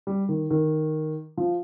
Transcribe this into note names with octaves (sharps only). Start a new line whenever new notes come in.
G3
D#3
D#3
F3